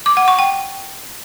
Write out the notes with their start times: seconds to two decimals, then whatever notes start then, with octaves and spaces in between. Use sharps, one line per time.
0.06 D6
0.17 F#5
0.28 C#6
0.39 G5